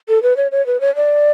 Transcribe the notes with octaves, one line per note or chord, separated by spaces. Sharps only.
A4
B4
C#5
C#5
B4
C#5
D5